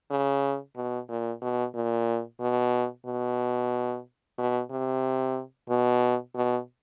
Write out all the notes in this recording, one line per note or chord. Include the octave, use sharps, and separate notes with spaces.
C#3
B2
A#2
B2
A#2
B2
B2
B2
C3
B2
B2